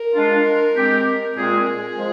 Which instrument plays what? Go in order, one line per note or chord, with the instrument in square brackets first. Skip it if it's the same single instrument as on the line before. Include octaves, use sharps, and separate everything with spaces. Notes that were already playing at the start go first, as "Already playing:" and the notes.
Already playing: [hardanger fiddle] A#4
[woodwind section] G#3 D4 F4
G#3 C4 G4
[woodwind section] A#2 G#3 C4 F4 G#4 [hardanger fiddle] A#4
[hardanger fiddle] G#4
[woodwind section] F3 G#3